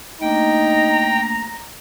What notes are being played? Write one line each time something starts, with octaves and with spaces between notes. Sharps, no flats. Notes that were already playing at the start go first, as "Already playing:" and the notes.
A3 A#3 D4 D#4 G5 A#5